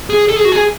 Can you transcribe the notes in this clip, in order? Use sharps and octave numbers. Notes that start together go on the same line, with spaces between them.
G#4
A4
G#4
F#4
G#4